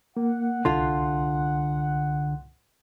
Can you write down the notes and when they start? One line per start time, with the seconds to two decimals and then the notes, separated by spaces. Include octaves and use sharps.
0.17 A#3 F#5
0.65 C2 D3 F4 C6